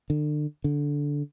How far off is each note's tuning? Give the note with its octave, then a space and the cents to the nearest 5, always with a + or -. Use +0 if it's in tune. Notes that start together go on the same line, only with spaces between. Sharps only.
D3 +35
D3 -10